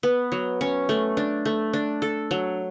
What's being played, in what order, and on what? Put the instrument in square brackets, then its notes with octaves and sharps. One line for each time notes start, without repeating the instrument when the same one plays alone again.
[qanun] B3
F#3
C#4
A3
D4
A3
D4
A4
F#3